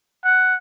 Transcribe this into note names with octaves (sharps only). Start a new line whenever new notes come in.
F#5